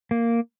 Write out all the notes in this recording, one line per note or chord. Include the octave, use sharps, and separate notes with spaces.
A#3